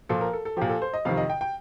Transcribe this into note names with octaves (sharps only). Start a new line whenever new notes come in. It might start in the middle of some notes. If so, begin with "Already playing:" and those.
A#2 F3 A4
A#4
A4
A4
A#2 F3 G4
A4
C5
D#5
F2 C3 D#3 F5
D#5
G5
G5